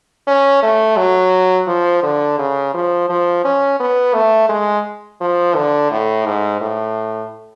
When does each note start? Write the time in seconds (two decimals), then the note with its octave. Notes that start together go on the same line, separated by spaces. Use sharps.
0.27 C#4
0.62 A3
0.97 F#3
1.67 F3
2.03 D3
2.39 C#3
2.74 F3
3.09 F3
3.44 C#4
3.80 B3
4.14 A3
4.49 G#3
5.21 F3
5.55 D3
5.91 A2
6.26 G#2
6.61 A2